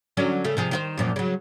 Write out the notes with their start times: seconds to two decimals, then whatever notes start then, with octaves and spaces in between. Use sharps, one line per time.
0.17 D3 F#3 C#4
0.44 C#3 A3
0.57 C3 F3 G#4
0.71 D#3 F4 C5
0.97 F#2 A#2 F3
1.16 C#3 F#3